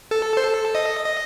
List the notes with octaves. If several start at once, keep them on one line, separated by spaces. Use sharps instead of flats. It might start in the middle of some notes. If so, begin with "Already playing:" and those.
A4
C5
A4
D#5
D#5